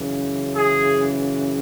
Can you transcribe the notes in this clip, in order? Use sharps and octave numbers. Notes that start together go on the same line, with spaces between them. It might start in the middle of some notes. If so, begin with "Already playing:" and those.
Already playing: F#2 C#3 E3
G#4